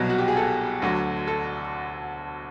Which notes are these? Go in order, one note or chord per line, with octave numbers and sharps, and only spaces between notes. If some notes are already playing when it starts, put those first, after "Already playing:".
Already playing: C2 B2 F#3
F#4
G4
G#4
A4
D2 D3 F#3
A4